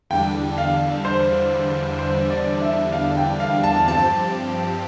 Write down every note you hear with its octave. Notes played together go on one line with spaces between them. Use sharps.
E2 D3 G3 D4 G5
F5
C5
C5
D5
E5
F5
G5
F5
A5
G2 F3 C4 G4 A5